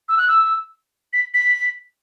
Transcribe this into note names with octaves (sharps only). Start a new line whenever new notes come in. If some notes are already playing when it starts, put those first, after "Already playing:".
E6
F#6
E6
B6
B6